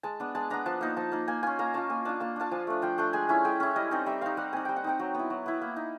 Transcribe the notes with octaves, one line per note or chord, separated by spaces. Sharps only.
G#3 A5
B3 D4
G#3 A5
B3 D4 A#5
F3 A5
A#3 D#4
F3 A5
A#3 D#4
A#3 G#5
C#4 F4 G#5
A#3 A#5
C#4 F4 A5
A#3 G#5
D4 F4 A5
A#3 A5
D4 F4 A5
F3 G#5
A3 D4
F3 G5
A3 D4 G5
G#3 G#5
C#4 E4 G#5
G#3 G5
C#4 E4
G3 D#5
C4 D#4
G3 E5
C4 D#4 F5
G3 F#5
C4 D#4 G#5
G3 G5
F#5
C4 D#4 G5
F#3
B3 E4
F#3
B3 E4
A#3
D#4